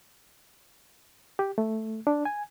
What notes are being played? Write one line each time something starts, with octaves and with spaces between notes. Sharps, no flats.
G4
A3
D4
G#5